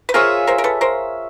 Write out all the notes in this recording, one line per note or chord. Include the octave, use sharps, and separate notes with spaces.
B4
F4 G#4 A#4 C5 C#5 E5
A#4 C5
A#4
A4 B4
A#4 C5